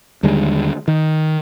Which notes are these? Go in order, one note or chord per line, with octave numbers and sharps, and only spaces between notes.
D#2 D3 G3 G#3
D#3